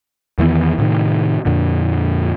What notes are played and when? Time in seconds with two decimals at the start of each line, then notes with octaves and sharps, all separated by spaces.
0.38 E2 D#3 E3 B3
0.78 A2 C3 D#3
1.45 F2 A#2 D3